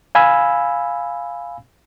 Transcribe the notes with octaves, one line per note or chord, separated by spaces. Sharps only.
F5 G#5 B5 E6